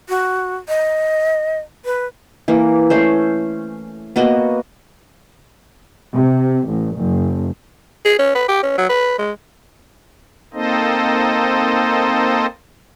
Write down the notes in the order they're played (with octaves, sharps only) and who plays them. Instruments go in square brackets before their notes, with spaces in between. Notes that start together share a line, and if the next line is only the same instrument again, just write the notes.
[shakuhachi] F#4
D#5
B4
[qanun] E3 A#3
A3 C#4 C5
A#3 B3 F#4 D#5
[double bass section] C3
A1
F#1
[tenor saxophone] G#4
C#4
B4
G4
C#4
F#3
B4
G#3
[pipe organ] A#3 C4 D#4 A4 C5 D#5